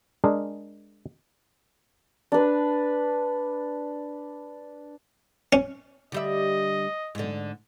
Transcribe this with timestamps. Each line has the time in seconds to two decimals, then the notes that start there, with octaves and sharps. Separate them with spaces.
0.24 G#3 D4 G#4 A#4
2.32 D4 B4
5.53 C#4
6.12 D3 G3 D#5 E5
7.15 G#2 D3